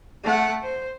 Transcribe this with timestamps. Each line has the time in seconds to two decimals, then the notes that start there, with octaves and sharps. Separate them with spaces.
0.24 A3 F#5
0.63 C5